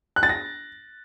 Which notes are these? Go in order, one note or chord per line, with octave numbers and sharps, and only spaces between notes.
F#6
A6
A#6